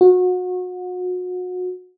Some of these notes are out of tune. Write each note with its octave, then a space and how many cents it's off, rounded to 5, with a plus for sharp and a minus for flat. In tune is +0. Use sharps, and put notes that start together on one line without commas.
F#4 -30